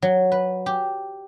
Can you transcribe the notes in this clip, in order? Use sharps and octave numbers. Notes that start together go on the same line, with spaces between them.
F#3
B4
G4